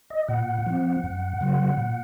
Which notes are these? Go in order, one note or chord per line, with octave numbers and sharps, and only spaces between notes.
D#5
A#2 F#5
F3 C4
F#2
C#3 F#3
A#2